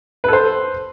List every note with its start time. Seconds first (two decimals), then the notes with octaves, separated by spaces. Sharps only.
0.24 B4
0.28 A4
0.33 C5